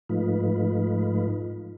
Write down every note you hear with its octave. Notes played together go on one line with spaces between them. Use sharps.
G#2 F3 A3 D#4 F4 B4